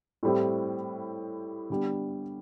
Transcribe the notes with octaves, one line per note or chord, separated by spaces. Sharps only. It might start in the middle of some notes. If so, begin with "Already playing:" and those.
A2 G3 C4 E4
D3 G3 B3